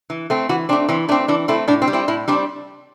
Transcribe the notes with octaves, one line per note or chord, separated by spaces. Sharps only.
E3
A3 C4
E3 F#4
A3 C4 D4
E3 C4
A3 C4 D4
E3 D4
A3 C4 E4
A2 D4
C4
G3
C4 E4
A2 E4
G3 C4 D4